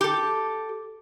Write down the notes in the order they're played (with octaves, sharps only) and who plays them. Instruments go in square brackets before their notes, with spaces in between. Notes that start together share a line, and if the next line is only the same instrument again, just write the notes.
[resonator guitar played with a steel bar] G4 A4